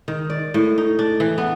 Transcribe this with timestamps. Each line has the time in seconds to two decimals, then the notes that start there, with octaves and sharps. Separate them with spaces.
0.08 D#3
0.30 D5
0.54 A2
0.78 D#4
0.99 D4
1.20 E3
1.38 B3